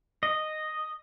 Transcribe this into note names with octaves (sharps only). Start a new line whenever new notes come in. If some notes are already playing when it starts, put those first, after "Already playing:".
D#5